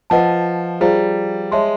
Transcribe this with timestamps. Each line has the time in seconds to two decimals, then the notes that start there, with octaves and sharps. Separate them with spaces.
0.10 F3 B4 D#5 F#5 A5
0.81 G3 F4 G#4 C5 F5 A#5
1.52 G#3 C#5 E5 A5 C6